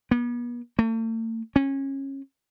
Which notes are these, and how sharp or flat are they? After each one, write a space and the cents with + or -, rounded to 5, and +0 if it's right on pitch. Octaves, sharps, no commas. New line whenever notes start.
B3 -40
A3 +45
C#4 -25